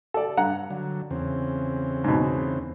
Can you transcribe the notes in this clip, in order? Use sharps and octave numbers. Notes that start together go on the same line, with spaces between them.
A4 D5
G2 F#5 A#5
D3 F#3
E2 C#3 C4
G#2 B2